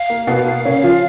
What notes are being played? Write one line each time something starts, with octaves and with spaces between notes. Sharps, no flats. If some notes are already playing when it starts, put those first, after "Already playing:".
Already playing: F5
A#3
B2 B3
A#3
C#3 C#4
F3 F4